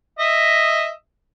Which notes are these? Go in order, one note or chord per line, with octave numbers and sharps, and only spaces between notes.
D#5 E5